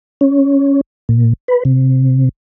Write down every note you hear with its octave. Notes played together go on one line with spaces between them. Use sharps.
C#4
A#2
B4
C3